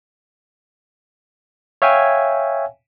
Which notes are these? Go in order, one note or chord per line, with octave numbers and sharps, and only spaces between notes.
C#5 E5 F5 G5 G#5